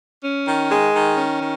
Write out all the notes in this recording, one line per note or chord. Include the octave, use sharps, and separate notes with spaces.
C#4
D#3
G#3
D#3
C#4
D#3